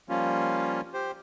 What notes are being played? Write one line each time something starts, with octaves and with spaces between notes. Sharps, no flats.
F3 G3 A#3 C#4 F4
G4 C5